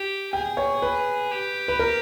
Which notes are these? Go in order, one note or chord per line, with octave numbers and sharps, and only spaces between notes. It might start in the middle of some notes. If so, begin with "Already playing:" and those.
Already playing: G4
G#4 G5
C#5
B4
G4
B4
A#4